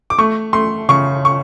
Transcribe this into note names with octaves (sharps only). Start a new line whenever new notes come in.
D6
A3 C#6
A3 C6
C#3 C#6
C#6